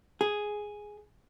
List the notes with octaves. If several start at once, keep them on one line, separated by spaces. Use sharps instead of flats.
G#4